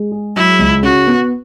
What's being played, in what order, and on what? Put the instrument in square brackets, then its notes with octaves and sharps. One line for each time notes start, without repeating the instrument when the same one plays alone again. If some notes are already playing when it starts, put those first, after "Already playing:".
Already playing: [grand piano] G#3
G#4
[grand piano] F#3 [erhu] E4
[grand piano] C#2
[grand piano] C#3 [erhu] F#4
[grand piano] B3